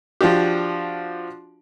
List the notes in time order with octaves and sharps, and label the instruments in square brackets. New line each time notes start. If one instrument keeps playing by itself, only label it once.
[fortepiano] F3 D4 F#4 G4